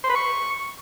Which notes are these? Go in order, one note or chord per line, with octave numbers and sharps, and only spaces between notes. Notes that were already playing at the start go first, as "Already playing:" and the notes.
C5
B4
C#6